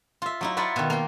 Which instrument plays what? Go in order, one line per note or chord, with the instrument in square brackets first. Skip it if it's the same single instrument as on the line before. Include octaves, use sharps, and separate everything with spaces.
[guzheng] F4 E5
F#3 D#4 E4
E4 F4 B4 D5 E5 F#5
B2 D#3
A#3 G5